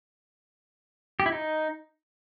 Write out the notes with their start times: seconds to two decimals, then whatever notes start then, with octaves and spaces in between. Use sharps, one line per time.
1.20 G4
1.26 E4
1.32 D#4